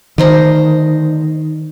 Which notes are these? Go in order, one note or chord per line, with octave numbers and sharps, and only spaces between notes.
D2 D#3 C5 A#5